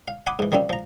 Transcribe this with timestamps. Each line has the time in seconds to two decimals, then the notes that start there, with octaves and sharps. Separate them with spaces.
0.08 F5
0.27 F#5 G#5 B5 C6 D6 D#6
0.39 G#2 E3
0.52 D#3 F3 G3 C4 C#4
0.69 F3 A#5